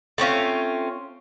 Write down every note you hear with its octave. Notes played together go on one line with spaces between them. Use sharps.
A3 C4 C#4 F4